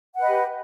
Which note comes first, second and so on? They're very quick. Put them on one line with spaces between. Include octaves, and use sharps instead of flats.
F#5 B4 D#5 G4